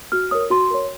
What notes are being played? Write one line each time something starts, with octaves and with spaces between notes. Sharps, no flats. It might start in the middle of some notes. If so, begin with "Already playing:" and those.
F#4 F6
A#4 C#5 D#6
F#4 C6
A#4 C#5